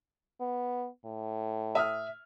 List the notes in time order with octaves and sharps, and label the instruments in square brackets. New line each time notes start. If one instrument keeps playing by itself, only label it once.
[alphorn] B3
A2
[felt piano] E5 D#6 F6